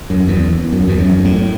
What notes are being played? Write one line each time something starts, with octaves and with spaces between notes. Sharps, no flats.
F#2
E2
F#2
E2
F#2
G#2
A2